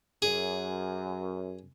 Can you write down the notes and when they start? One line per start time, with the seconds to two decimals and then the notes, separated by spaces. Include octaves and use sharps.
0.22 F#2 G#4